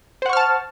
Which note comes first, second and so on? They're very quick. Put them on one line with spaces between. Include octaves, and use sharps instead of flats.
C5 F#5 C#6 F6 A5